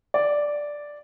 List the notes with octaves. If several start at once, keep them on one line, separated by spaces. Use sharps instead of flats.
D5